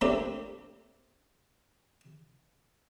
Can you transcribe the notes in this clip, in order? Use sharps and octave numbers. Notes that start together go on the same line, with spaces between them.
A3 A#3 C4 D4 G4 A4